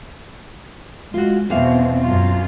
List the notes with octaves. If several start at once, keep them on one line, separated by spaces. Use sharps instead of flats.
G#3 F4 F#4
E2 B2 C4 F5
F#2 F4